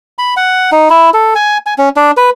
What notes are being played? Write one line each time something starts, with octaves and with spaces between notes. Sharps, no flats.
B5
F#5
D#4
E4
A4
G#5
G#5
C#4
D4
B4